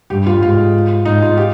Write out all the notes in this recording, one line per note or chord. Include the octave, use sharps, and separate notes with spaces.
G2 G4
F4
G#2 F4
G#2 D#4
F4
G4